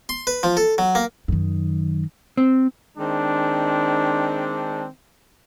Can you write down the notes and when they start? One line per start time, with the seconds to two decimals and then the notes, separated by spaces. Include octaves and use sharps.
0.09 C6
0.27 B4
0.43 F3
0.57 A4
0.78 F#3
0.95 A#3
1.28 F#2 D#3
2.37 C4
2.98 D#3 G#3 C4 D4